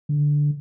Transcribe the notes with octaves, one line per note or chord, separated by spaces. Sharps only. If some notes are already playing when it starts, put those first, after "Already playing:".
D3